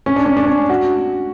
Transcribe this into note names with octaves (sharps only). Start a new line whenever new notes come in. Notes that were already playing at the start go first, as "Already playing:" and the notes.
C#4
D4
C#4
D4
C#4
F#4